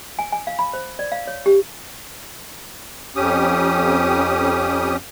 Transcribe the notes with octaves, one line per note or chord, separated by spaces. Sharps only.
G#5
G#5
F5
B5
C5
D5
F5
C#5
G4
F2 C#4 G4 D#6